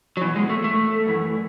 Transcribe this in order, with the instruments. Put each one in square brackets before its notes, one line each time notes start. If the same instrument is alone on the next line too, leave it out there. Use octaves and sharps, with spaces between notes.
[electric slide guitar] F#3
E2 B2 E3
G#3
A3
A3
F#2 E3